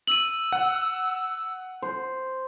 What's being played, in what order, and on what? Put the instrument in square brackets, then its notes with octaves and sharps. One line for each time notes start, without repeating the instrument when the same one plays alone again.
[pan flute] E6 [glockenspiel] D#7 F#7
[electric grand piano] F#5
[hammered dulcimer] C5